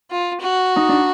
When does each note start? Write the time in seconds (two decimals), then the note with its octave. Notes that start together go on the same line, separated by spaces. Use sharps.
0.11 F4
0.40 F#4
0.76 D#4
0.89 D4